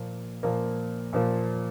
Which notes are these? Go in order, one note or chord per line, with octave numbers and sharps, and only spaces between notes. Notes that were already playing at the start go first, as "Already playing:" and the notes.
Already playing: A#2 F3 A#3
A#2 F3 A#3
A#2 F3 A#3